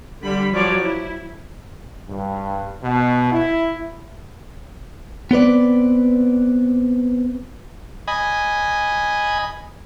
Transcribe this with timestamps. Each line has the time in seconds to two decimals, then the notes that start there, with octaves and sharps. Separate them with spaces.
0.22 D3 G3 B5
0.53 F3 F#3 C#5 D5
0.82 E4
2.09 G2
2.83 B2
3.31 E4
5.31 B3 C4 B4 D5
8.08 D#5 G#5 B5